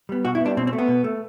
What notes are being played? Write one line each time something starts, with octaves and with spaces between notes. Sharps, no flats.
G3 B3
B2 F#4
E4
G3 B3 D4
B2 C4
C4
A3
B3
B2
A3